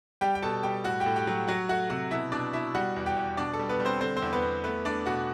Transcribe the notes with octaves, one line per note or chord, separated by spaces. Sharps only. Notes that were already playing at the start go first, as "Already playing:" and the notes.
G3 G4 G5
G5
B2 A4 A5
G3 G4 G5
A2 F#4 F#5
G4 G5
A2
G4 G5
F#3
F#3 F#4 F#5
A3 F#4 F#5
C3 F#4 F#5
B2 E4 E5
B2 D4 D5
B2 E4 E5
G3 F#4 F#5
E2
G4 G5
E2
B2 D4 D5
A4
G3
B3 B4
G3
C4 C5
D3 C4 C5
C4 C5
E2
B3 B4
E2
A3 B3 B4
A3 D4 D5
B2 F#4 F#5